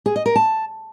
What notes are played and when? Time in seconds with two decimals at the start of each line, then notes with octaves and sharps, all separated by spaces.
0.06 G#4
0.16 D#5
0.26 A#4
0.36 A5